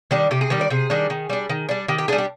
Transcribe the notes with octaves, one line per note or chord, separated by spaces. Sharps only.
D#3 G3 D4
C3 G4
G#4
D#3 G3 D4 G4
D5
C3 G#4
D#3 G3 D4
D#3
G3 D4
D#3
G3 D4
D#3 G4
G4
G3 D4 G#4
G4